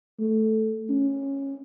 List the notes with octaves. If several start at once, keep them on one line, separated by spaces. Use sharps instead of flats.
A3
C#4